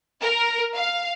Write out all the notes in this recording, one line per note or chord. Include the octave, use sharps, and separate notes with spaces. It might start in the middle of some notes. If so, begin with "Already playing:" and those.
A#4
F5